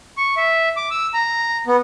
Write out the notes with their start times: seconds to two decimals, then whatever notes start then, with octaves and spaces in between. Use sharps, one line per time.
0.18 C#6
0.37 E5
0.77 D6
0.91 E6
1.14 A#5
1.67 B3